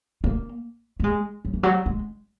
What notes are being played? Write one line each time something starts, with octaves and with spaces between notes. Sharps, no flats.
A#3
A#3
G#3
F#3
E3
F#3
G#3